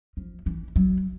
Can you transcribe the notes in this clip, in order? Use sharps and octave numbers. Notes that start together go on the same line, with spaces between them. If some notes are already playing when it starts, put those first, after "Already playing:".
F3
E3
F#3